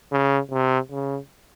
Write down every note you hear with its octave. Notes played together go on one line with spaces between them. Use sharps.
C#3
C3
C#3